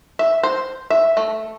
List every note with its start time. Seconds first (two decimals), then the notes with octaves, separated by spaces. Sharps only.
0.19 E5
0.43 C5
0.90 E5
1.17 A3